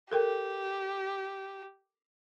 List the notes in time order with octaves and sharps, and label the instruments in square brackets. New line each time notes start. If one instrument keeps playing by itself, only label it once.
[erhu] G4 [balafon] A4 A#4 G5